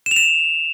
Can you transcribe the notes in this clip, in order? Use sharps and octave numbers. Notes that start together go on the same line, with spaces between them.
E7
F7
E7